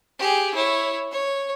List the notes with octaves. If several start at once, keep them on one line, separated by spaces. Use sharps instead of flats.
G4 G#4
E4 C#5
C#5